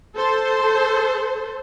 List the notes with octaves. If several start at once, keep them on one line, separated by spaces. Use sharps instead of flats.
A4 C5